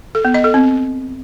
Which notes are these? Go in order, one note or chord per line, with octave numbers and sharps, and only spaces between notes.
A4
B3
D#5
A4
C4